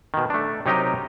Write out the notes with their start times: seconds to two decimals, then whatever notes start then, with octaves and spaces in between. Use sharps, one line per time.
0.14 B2 D#3
0.30 A3 D4
0.66 C3 F#3 D#4 G4 A#4 D#5